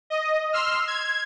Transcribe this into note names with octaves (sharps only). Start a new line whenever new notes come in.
D#5
C6 E6 F6
G#6